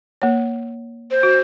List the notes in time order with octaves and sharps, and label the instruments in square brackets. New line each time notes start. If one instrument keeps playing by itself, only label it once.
[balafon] A#3 C#5
[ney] C5
[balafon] F#4